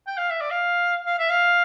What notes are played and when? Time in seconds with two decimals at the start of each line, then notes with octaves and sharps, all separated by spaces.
0.07 G5
0.17 F5
0.30 E5
0.41 D5
0.51 F5
1.06 F5
1.18 E5
1.30 F5